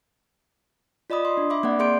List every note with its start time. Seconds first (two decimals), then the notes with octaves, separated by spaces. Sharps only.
1.10 F4 D5 D#5 B5 D#6
1.25 C6
1.37 D4
1.50 E5 B5 D6
1.63 A#3 C4 D5 F#5
1.79 A#3 G#4 D5 C6 G6 D7